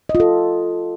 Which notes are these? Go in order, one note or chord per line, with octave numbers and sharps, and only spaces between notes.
D#5
F4
A4